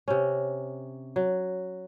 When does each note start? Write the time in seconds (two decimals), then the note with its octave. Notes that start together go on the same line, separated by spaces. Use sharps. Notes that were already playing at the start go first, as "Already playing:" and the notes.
0.08 C3 C#4
1.16 F#3